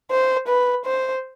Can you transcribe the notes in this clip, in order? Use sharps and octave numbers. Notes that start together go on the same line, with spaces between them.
C5
B4
C5